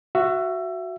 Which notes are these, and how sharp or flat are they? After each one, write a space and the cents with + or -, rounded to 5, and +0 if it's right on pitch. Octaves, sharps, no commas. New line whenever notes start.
F#4 +0 E5 +25